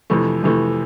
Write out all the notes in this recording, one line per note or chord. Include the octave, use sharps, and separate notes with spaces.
F2 C3 E3 A3
F2 C3 E3 A3